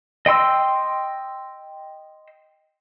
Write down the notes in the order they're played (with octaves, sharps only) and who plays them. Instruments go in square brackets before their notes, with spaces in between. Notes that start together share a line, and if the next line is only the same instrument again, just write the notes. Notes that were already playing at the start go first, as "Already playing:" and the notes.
[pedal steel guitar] D#5 G5 C6 E6